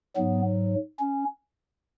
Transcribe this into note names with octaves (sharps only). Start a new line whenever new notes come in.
G#2 F#3 B3
C#4